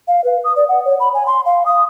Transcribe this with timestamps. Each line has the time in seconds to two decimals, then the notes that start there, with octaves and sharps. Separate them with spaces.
0.08 F5
0.24 B4
0.44 D#6
0.56 D5
0.69 F#5
0.85 C#5
1.00 B5
1.14 G#5
1.27 C6
1.46 F5
1.66 D#6